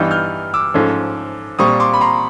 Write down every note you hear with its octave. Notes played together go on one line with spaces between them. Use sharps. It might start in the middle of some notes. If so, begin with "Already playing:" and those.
Already playing: G2 E3 G3 B3 D#4 F6 G6
F6 G6
D6 E6
G#2 F3 A3 C#4
A#2 G3 C4 C#6 D#6
C6 D6
B5
A#5 C6